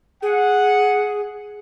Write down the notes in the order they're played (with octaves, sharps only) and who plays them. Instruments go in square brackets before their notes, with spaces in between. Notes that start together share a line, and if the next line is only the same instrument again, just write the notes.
[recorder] G#4 [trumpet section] F#5